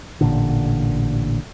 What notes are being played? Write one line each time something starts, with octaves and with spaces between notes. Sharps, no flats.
A1 A#2 D3